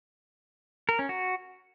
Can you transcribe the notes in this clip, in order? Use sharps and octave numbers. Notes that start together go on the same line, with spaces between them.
A#4
C#4
F#4